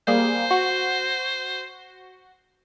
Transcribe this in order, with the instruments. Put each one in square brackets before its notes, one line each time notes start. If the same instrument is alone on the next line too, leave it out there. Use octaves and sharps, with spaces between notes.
[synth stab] G3 A#3 G#4 [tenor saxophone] C5
[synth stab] F#4